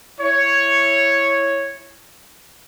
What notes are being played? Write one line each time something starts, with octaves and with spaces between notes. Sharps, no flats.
E4 C#5